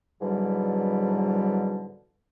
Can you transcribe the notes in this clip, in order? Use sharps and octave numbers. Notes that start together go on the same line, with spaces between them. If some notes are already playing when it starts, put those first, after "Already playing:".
G#2 B2 D3 E3 F#3 G3